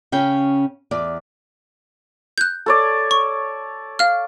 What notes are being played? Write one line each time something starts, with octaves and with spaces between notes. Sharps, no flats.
C#3 C#4 G5
E2 D5
F#6 G6
A4 C#5 D5
C#6
F5 F6